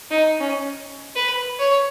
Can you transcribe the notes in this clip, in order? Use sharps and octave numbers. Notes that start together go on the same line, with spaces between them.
D#4
C#4
B4
C#5